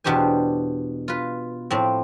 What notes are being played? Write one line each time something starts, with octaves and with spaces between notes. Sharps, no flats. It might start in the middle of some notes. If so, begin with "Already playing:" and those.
E2 B2 D4 G4 C5 G#5
F4 B4
A2 F3 C4